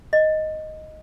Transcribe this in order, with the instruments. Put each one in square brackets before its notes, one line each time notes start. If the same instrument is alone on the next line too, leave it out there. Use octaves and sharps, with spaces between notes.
[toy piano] D#5